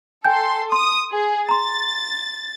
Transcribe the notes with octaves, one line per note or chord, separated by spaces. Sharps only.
A4 G5 G#5 C6 G6
C6 D#6
G#4
A#5 C6 A6